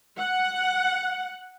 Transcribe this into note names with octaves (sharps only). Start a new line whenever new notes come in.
F#5